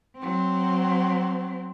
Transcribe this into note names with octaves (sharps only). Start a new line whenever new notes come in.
F#3 C4